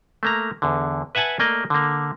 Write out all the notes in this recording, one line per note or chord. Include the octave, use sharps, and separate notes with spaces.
A3 A#3 A#5
E2 D3
B4 E5 F#5 G#5 A5
A3 A#3 D5 D#5
D3 A#3